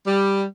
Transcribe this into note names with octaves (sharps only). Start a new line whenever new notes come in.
G3